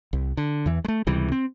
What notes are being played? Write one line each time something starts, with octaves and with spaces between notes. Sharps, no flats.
C2
D3
E2 E3
G#3 A3
C#2 C3 E3 G3
C4